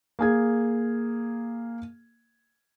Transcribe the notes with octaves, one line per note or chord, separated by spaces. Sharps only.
A#3 G#4 G#6